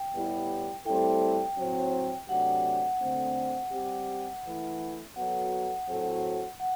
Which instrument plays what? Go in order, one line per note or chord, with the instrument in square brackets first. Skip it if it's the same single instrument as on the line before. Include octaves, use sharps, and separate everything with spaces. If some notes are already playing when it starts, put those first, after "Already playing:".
Already playing: [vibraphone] G5
[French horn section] A2 G3 B3 E4 G4
[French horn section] A2 G3 C4 E4 A4 [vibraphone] G5
[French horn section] A2 F#3 C4
[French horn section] C3 F#3 A3 D4 G4 [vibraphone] F#5
[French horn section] D3 A3 C4
G3 C4 G4
E3 A3 E4
[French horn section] F#3 B3 F#4 A4 [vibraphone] F#5
[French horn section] A2 F#3 C4 F#4 A4
[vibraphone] F#5